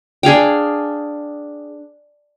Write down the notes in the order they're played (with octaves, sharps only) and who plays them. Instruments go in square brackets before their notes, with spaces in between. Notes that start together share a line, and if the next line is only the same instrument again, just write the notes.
[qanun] D4 G#4 F5 G5